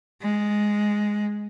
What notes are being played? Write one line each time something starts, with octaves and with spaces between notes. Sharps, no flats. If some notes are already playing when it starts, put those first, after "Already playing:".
G#3